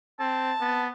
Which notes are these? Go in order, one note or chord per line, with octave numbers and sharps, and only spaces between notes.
C4 A5
B3